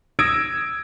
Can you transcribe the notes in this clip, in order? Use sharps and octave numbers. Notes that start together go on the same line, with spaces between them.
D#6 E6 G#6 A#6 D7